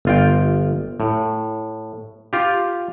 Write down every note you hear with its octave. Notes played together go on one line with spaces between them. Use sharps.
G1 F4 G5
A2
F4 G4